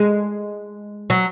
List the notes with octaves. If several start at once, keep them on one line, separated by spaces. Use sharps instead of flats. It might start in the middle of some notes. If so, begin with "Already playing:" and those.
Already playing: G#3
F#3